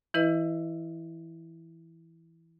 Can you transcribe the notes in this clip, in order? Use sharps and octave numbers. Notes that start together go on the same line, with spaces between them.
E3 E4 B4 D#5